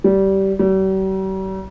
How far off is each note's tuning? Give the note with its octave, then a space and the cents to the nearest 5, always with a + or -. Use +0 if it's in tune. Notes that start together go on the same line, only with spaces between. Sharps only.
G3 -20
G3 -45